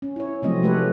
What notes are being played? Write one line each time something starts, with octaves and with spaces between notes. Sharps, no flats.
C#4
E4 C#5
C3 F3 F#3 A3 C4 D#5
G#3 A3 G4 A4 B4 C#5